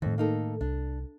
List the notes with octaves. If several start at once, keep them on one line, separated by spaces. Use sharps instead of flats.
F2 A2 D#3
A#3 D#4 A4
C2 D4